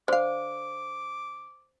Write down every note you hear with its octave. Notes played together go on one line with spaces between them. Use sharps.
D3 C5 F5 D6